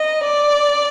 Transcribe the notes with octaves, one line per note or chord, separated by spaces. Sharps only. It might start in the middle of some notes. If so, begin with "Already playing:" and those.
Already playing: D#5
D5